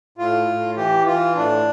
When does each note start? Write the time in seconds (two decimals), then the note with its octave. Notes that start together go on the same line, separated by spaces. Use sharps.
0.18 A2 F4
0.47 A2
0.77 E3 G4
1.06 E3 F4
1.35 A2 D4